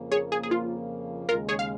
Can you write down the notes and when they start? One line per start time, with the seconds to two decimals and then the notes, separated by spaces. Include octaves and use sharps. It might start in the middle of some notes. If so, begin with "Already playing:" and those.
Already playing: F2 C#3 F3 A#3
0.12 G#4 C#5
0.32 G#4
0.43 G#4
0.51 F4
1.29 D#2 C#3 G#3 F4 A#4
1.49 G#4 C#5
1.59 F5